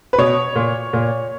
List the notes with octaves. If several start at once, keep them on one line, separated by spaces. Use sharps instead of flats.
B4
B2 C#5
A#2
A#2